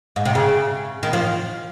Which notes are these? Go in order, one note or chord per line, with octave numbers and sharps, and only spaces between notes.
G#2
C3
C#3
D#3
F3